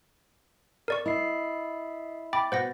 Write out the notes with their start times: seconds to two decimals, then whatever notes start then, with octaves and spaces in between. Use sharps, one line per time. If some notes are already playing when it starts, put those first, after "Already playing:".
0.88 A#4 D5 C#6
1.06 E4 D#5 C7
2.33 G5 B5 D6 A6
2.52 B2 C5 F#5 A#6